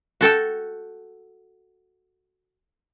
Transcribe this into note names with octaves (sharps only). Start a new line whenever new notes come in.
F#4 A4 G5 A5